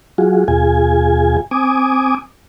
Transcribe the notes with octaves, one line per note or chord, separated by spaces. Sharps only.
F#3 F4 F#4 G#4
D#2 B2 F4 G#4 G#5
C4 G#5 D6 D#6